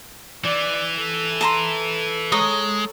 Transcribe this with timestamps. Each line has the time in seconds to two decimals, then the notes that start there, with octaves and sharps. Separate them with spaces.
0.44 E3 D5
0.97 A4
1.41 A5 A#5 C6
2.32 G#3 C#5 A#5 D#6